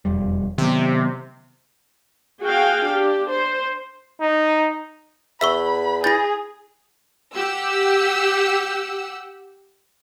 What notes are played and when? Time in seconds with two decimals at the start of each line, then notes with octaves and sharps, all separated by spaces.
0.05 E1 F2 G3
0.58 C3 D#3 F#3 B3
2.43 F#4 G#4 F5 G5
2.86 D4 G4
3.29 C5
4.20 D#4
5.41 E2 E5 B5 C#6 E6 B6
6.04 E4 G#4 G6 A6 A#6
7.35 G4 F#5 E6